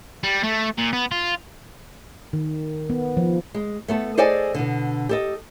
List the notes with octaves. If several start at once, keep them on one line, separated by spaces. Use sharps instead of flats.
G3
A3
A#2
B3
F4
D#3
B3
F3
G#3
A3 B3 A4
G#4 A4 C5 D5 D#5 G#5
B2 D3
G4 A4 D#5